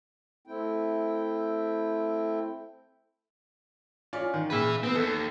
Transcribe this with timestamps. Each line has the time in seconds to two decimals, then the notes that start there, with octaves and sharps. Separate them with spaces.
0.47 A3 C4 E4 G5
4.13 C#4 F4 D5
4.34 D#3
4.50 A#2 C#3 B4 E5
4.83 B3 C4
4.95 D#2 A4